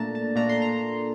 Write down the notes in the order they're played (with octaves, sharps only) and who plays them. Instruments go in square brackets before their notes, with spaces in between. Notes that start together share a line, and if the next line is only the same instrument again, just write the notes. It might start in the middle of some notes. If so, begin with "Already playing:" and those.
Already playing: [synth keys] A#2 A3 D4 A5 A#5
A5
A#2 A3 D4 A#5
C6
A#5